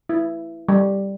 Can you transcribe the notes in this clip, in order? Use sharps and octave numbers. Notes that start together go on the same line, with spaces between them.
E4
G3